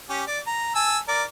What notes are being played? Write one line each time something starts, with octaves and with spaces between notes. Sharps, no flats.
C#4 G4
D5
A#5
G#5 A5 E6
A#4 D5